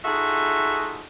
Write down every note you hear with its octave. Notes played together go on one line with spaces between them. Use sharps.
D#4 F4 F#4 G#4 A4 E5